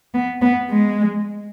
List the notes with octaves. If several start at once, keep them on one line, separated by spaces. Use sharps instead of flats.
B3
B3
G#3